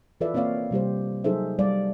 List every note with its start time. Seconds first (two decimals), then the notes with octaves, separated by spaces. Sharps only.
0.21 E3 F4 A4 B4 D5 E5
0.34 A#3 C4 C#5 D5 F5
0.71 C3 G3 G4 C5
1.24 F#3 D#4 G#4 A4 C5 E5
1.59 G3 D5 F5